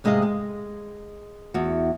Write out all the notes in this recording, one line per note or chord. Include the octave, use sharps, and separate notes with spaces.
G#2 C3 G#3 G#4 D#5 F5
G#3
E2 F#4